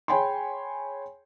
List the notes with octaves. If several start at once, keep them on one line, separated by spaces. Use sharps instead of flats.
G#4 C#5 G5 G#5 B5 C6